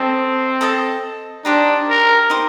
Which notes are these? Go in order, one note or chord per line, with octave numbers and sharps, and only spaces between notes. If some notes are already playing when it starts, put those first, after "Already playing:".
Already playing: C4 A4 D#5 A5
A4 D#5 A5
D4 D#4 G4 C5
A#4
D#4 G4 C5